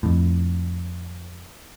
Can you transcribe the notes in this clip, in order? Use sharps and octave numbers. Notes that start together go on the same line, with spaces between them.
F2 A2